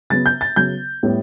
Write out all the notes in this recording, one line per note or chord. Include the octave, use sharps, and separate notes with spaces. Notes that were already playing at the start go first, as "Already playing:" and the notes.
C#3 F#3 B3 A6
G6
A6
C#3 F#3 B3 G6
A2 G3 B3